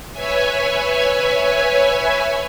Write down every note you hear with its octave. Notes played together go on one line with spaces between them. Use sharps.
B4 C#5 E5 G#5